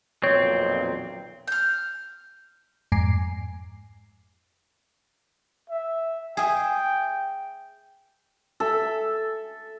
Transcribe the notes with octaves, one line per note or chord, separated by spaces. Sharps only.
B1 F2 A#2 C4 C#5
F6 G6
F2 G#2 G#5 A#5 D6 C7
E5
G#4 E5 G5
A4 E5